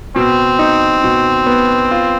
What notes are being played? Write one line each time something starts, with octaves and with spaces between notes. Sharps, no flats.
B2 C4
D#4
B2
B3
F4